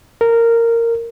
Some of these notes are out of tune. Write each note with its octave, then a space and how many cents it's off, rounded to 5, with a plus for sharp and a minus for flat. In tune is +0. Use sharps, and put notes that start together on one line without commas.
A#4 -15